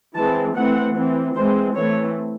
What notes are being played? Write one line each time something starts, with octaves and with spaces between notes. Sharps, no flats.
E3 G#3 C4 A5
E3 A3 C4 F#5
E3 C4
E3 G#3 C4 C5
E3 A3 C4 C#5